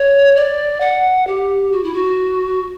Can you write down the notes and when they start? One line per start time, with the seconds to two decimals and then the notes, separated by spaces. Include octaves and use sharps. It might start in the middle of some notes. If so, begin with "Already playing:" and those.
Already playing: C#5
0.36 D5
0.81 F#5
1.27 G4
1.72 F#4
1.84 E4
1.94 F#4